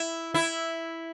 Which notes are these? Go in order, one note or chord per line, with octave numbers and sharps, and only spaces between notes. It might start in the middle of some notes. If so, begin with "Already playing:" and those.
Already playing: E4
E4